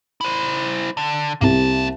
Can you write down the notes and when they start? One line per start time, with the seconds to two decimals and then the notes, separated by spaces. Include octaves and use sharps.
0.21 E4 C5
0.97 D3
1.41 C2 C3 A#3 A5